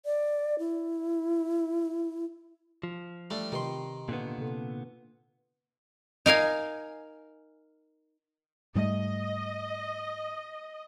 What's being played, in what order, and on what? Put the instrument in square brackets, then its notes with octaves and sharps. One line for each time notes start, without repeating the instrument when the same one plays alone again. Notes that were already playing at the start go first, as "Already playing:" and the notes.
[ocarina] D5
E4
[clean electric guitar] F3
[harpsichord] G3 A3 D4
[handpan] C3 G4 B4 [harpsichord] D#3 C6
[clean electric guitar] A#2 D3 B3
[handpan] C3 A4
[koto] D#4 A#4 F5 G#5
[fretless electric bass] G#2 G3 A3 [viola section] D#5